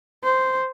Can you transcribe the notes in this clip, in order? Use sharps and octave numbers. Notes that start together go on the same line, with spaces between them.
C5